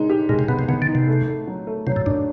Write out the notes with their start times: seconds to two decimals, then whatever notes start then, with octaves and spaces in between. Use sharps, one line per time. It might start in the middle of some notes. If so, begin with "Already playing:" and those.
Already playing: G#3 D#4
0.10 G4
0.29 A#2 G#3
0.39 C3
0.48 B2 B3
0.59 C3
0.68 C#3 B3
0.82 D3
0.88 D#4
0.95 C3
1.08 A3
1.27 A3
1.47 F#3
1.67 A3
1.87 C3 F#3
1.96 A2
2.06 G2 D4